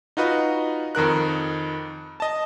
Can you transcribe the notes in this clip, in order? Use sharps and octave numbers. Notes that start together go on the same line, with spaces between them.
D#4 F4 F#4 B4 D#5
F2 D#3 A#4 F#6
D#5 A5